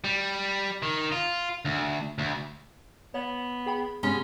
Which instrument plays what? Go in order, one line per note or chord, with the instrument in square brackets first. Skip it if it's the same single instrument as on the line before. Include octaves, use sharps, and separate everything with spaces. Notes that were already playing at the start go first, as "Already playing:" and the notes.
[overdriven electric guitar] G3
D#3
F4
D2
D2
[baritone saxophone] B3 [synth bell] C#5
[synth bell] G#4 G5 B5
[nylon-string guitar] C3 G#3 [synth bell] B3 A#5 G7 [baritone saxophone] C#4